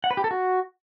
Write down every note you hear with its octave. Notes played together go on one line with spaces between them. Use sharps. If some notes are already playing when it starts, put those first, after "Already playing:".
F#5
B4
G4
A4
F#4